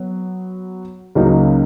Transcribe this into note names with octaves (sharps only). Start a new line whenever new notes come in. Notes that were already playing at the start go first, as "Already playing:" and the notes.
Already playing: F#3 B3 F#4
C#2 C#3 F#3 A#3 D#4